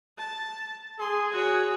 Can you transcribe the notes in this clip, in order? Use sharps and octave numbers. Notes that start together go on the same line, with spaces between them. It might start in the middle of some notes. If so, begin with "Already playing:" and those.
A5
G#4 C6
F#4 C#5